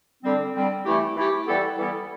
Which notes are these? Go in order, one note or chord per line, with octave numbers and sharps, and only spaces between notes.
D3 G3 C4
D3 G3 C4
E3 A3 E4 G4
E3 A3 E4 G4
E3 G3 B3 E4 A4
E3 G3 B3 E4 A4